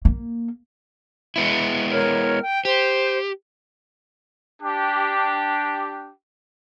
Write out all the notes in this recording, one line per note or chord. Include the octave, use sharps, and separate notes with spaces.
A#3
G#3 B3 E4
A#4 C#5 F6
G5
G4 C5
D4 G4